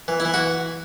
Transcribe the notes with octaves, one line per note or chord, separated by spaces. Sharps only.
E3
E4
E3
F#4